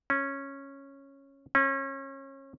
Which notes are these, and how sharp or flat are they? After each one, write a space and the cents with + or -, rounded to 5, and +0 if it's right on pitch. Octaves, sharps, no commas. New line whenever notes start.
C#4 -10
C#4 -30